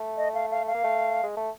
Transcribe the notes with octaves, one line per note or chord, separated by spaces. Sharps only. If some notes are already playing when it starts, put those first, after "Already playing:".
Already playing: A3
D#5
F5
F5
F5
A#3
A3
G#3
A3